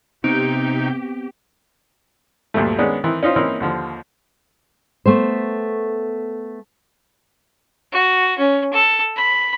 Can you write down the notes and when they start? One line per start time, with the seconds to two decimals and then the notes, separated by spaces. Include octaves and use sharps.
0.24 C3 B3 C4 D#4 G4 G6 D7
2.54 D2 G2 A#2 F3 A3
2.78 D#3 G#3 B3 C#4 D4
3.04 D#3 E3 C4
3.23 C#4 D#4 F4 C5
3.36 E3 A#3 C4 C#4 D#4 E4
3.60 D#2 D3 F3
5.05 A3 B3 C5
7.92 F#4
8.38 C#4
8.73 A4
9.16 B5